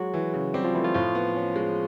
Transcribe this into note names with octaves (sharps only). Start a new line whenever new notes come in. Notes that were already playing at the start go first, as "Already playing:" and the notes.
Already playing: F#3 G#3 F#4
E3
C#3
G3 C4 G4
F3 F4
E3 A3 E4
F3 F4
A2 F3 F4
B3
C#4
G#3